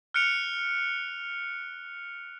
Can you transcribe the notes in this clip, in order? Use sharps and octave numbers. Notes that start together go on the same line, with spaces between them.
F6 F#6 C#7 D7 F7